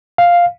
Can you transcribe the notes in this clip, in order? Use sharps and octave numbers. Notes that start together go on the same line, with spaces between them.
F5